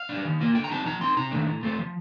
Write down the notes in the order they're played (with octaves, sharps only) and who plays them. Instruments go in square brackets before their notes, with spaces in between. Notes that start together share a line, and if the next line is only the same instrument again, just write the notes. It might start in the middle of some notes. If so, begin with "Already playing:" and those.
Already playing: [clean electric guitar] F5
D4
G3
D#3
A#3 F4
D3 G5
A#5
G3 C4 D#4 A5
F3 A#5
C4 D#4 C6
C3 A#5
D#3 A3 D4
A2
A3 C4 F4
F3